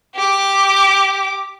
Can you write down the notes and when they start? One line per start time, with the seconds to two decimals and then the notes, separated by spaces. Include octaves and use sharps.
0.16 G4 D6